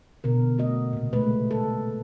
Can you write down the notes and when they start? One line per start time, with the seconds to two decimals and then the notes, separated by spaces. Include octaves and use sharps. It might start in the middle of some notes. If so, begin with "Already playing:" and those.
0.24 B2 D3 A#4
0.58 A3 F#4 D#5
0.93 A#2 C#3
1.13 G#3 A3 B4
1.51 A4